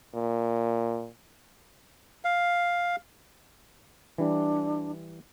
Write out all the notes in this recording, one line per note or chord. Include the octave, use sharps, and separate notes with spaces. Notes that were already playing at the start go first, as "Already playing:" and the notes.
A#2
F5
E3 G3 D4